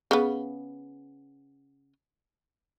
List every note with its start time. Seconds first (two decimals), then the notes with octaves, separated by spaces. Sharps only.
0.11 C#3 B3